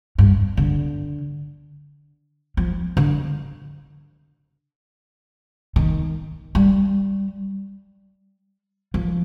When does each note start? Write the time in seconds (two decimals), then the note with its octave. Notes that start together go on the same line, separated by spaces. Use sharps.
0.18 G2
0.57 D3
2.57 F3
2.97 D3
5.76 D#3
6.55 G3
8.94 F3